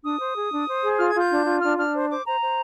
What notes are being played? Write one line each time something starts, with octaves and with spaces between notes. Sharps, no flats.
D4 D#6
C5
G#4
D4
C5
G#4
F4 F6
G#6
F4 G6
D4
F4
D4 F6
D4 F6
C5
C5 D6
C5 A#5
C5